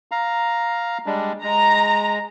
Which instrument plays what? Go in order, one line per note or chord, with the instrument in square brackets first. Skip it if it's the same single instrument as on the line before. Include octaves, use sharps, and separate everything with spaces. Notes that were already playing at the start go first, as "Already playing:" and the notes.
[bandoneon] F5 A#5
G3 G#3 D4
[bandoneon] G#3 [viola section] A#5